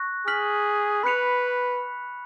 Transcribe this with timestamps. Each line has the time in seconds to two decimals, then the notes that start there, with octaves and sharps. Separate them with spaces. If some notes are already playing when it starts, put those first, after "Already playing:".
Already playing: C#6 F#6 A#6
0.27 G#4 F6 B6 F#7
1.03 B4 B5 F#6 C#7 F7